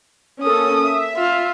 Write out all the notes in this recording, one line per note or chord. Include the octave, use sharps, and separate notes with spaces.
A#3 C#4 A4 D#6
E5
F4